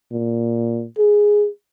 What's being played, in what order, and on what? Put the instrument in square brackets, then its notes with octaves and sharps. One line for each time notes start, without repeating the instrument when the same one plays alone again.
[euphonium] A#2
G#4